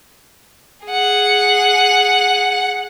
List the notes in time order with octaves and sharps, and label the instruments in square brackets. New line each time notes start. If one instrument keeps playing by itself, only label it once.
[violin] G#4 F#5